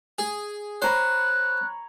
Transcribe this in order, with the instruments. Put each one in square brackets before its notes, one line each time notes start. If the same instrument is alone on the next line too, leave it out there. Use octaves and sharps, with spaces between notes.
[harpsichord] G#4
[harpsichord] C5 [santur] C#5 A#5 B5 [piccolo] F#6